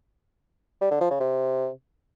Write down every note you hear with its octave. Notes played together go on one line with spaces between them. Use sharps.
G3
D3
F3
C#3
C3